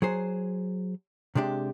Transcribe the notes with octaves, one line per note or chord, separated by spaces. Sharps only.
F#3 G#4 C5
C3 G#3 D4 G4